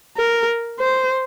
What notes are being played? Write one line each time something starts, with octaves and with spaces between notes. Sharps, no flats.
A#4
C5